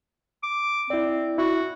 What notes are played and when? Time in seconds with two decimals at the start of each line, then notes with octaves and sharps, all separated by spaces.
0.43 D6
0.90 C4 E4 D5
1.38 E4 F#4